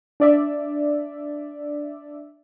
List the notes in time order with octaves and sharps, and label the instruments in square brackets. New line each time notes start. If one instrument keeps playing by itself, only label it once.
[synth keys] D4 D5 E5